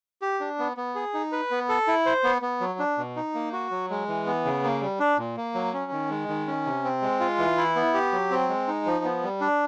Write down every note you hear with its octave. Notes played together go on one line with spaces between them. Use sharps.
G4
D4
B3
B3
G#4
D#4
B4
B3
A4
E4
C5
B3
B3
F#3
D4
B2
D#4
A#3
F#4
F#3
G#3
E3
B3
C#3
A#3
G3
D4
A#2
A#3
F#3
C#4
D#3
G#3
D#3
C#4
C3
C4
G#3
F4
E3
E4
B3
G4
F#3
C4
G#3
D#4
F3
B3
G3
D4